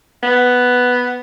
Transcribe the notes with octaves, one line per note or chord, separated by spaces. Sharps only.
B3